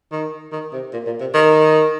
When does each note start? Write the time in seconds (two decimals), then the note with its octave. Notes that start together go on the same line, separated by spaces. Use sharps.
0.12 D#3
0.52 D#3
0.73 C3
0.93 A#2
1.06 A#2
1.20 C3
1.34 D#3